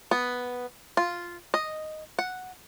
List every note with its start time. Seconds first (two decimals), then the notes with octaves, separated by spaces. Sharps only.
0.11 B3
0.97 F4
1.54 D#5
2.19 F#5